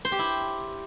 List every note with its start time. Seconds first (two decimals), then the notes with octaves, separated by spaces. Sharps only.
0.05 C5
0.12 G4
0.19 E4